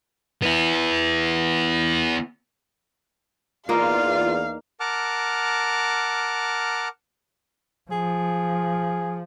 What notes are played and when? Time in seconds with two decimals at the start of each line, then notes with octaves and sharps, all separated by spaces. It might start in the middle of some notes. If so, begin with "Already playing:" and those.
0.42 B3 E4
3.69 E2 A#3 D#4 F4 A#4 D5 F5
4.80 A#4 F#5 A5 D6 F6
7.91 F3 G#4